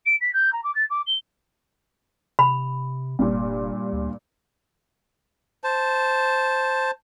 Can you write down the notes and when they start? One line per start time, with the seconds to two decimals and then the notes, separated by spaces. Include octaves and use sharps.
0.05 D7
0.21 B6
0.33 G6
0.52 A#5
0.63 D6
0.75 A6
0.90 D6
1.06 G7
2.39 C3 B5
3.19 F1 G2 A#2
3.93 D2
5.64 C5 A5